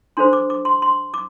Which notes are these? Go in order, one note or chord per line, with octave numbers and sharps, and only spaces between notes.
D4 A4 C5 C6
D6
D6
C6
C6
D6